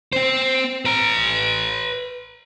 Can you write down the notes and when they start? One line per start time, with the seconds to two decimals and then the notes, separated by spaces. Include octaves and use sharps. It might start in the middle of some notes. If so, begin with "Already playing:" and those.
0.13 C4 C5
0.85 B4 A#5